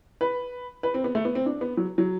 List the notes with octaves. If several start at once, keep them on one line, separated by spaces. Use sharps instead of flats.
B4
B4
C4
B3
A3
B3
C4
D4
B3
F#3
F#3